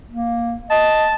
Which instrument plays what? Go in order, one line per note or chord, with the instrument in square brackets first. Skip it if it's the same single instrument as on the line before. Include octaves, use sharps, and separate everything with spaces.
[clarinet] A#3
[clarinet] D#5 [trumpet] A5